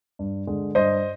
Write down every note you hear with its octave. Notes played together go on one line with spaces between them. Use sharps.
G2
D3 G#3
G2 C5 D#5